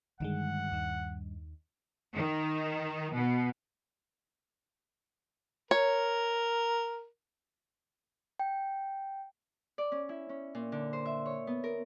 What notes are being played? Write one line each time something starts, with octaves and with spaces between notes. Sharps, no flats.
G2 D3 D#3 G#3 F#5
D#2 D#3
D#3
B2
A#4 C#5
G5
D5
C#4
E4
C#4
A#2
D3
C5
E5
C#5
B3
A#4